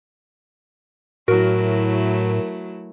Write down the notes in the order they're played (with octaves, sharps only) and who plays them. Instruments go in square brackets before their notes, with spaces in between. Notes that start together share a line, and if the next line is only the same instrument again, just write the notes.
[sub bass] A2 [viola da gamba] F#3 A3 E4 [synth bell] F#4 A#4